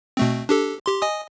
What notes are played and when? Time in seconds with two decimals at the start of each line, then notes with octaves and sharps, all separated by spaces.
0.17 B2 A3 C4
0.49 D4 G4 A4
0.86 G4 C6
1.02 D#5 G#5 D#6